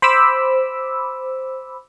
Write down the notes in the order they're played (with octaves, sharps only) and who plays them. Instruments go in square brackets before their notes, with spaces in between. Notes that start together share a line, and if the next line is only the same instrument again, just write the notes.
[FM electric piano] C5 B5 D6 E6